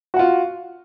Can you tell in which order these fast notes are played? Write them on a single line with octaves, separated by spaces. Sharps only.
F#4 F#5 F4